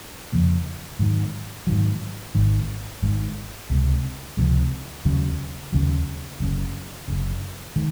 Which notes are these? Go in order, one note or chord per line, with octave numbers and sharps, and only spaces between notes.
F2 C#3 F3 A#3
G#2 D#3 F#3
G#2 D#3 F#3
G#1 G#2 D#3
G#1 G#2 D#3
C#2 C3 F3 G#3
C#2 C3 F3 G#3
D#2 C#3 F#3
D#2 C#3 F#3
F#1 F#2 C#3
F#1 F#2 C#3
D#3 G#3